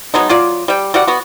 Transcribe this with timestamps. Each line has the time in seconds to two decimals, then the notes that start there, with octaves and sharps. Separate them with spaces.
0.14 F#3 G#3 B3 D#4
0.29 F#3 F4 D5
0.68 G3 G5
0.94 G3 F#4 D5 F#5
1.07 B3 F#4